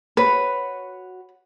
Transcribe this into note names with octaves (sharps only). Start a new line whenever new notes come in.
F#4 B4 C#5 F#5